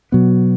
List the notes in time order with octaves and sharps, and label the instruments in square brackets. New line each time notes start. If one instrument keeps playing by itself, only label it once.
[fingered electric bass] B2 F#3 B3